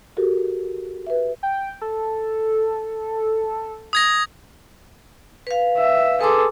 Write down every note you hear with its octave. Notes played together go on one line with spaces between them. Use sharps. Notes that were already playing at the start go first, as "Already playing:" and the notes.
F#4 G4 A4 A#4
B4 E5
G5
A4
D#6 G#6 A#6
B4 F5
E5
G#4 A4 B4 C6 D6